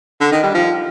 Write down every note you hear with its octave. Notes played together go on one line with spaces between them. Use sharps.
D3
D#3
G3
F3